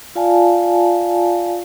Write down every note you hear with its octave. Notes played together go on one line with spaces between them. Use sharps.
F4 D5 F5 G#5 A5